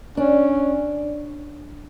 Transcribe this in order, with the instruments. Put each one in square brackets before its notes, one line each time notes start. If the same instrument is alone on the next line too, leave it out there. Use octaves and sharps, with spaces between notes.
[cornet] C#4 [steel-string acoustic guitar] D4